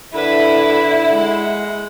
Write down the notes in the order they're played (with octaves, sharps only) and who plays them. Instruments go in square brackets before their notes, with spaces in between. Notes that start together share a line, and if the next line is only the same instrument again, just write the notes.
[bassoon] D3 [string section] E4 [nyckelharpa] B4
[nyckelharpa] G#3 F#5